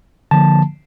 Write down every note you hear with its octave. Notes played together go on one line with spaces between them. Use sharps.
D3 F3 A#3 A5